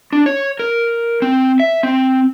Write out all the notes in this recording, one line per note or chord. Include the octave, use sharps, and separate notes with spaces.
D4
C#5
A#4
C4
E5
C4